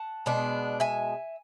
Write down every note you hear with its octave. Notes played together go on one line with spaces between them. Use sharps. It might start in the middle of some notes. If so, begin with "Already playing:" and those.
Already playing: F#5 A5
B2 G#3 B3 D4
E5 G#5